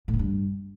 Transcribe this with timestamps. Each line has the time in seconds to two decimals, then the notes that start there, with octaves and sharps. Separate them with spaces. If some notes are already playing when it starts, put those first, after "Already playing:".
0.08 A2
0.14 D3
0.19 G2